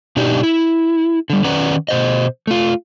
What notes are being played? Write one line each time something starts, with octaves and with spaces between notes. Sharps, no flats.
B2 D4 D#4 G4
E4
D3 G3
D#3 C#4 B4 D5 F#5 A#5
B2 C5 D#5
A3 F4